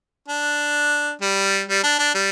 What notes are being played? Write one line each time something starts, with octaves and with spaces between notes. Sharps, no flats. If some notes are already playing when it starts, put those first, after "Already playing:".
D4
G3
G3
D4
D4
G3